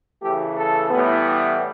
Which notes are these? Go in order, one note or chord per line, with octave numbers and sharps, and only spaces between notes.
C#3 E3 A3 G4
A4
A2 E3 G3 B3